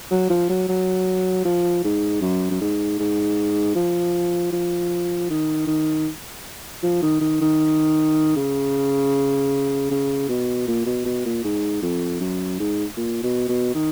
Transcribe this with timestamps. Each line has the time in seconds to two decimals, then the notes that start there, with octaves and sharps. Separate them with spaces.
0.11 F#3
0.30 F3
0.49 F#3
0.68 F#3
1.45 F3
1.84 G#2
2.21 F#2
2.51 F#2
2.61 G#2
2.99 G#2
3.75 F3
4.53 F3
5.30 D#3
5.67 D#3
6.83 F3
7.02 D#3
7.21 D#3
7.41 D#3
8.36 C#3
9.91 C#3
10.29 B2
10.68 A#2
10.86 B2
11.05 B2
11.25 A#2
11.44 G#2
11.82 F2
12.20 F#2
12.59 G#2
12.97 A#2
13.23 B2
13.48 B2
13.75 D#3